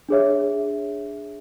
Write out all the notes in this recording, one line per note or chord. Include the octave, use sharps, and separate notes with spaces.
D4 G#4 C#5 E5